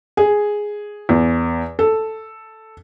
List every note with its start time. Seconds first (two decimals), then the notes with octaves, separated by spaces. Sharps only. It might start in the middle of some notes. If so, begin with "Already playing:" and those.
0.17 G#4
1.09 E2
1.79 A4